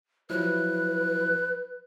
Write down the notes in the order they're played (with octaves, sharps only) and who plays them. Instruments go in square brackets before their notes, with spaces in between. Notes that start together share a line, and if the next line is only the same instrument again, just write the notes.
[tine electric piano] F3 F#3 E4 [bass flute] B4 [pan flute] F#6